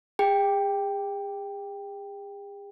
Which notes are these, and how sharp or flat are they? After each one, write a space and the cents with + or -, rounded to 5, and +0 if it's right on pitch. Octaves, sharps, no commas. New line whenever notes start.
G#4 -40 G5 +5